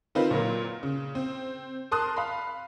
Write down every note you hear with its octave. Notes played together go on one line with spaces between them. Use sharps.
D#3 C4 D#4 F4 A#4 B4
A#2 F#3 A#3
C#3
C4
A#4 A5 C6 D#6 F#6
F5 B5